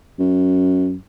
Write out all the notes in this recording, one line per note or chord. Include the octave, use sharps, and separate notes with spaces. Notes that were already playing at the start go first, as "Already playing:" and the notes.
F#2